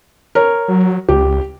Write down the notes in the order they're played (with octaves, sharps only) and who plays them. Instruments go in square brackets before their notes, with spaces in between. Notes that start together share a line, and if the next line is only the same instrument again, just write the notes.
[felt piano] A#4 C#5
[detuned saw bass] F#3
[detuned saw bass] C#2 [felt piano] G4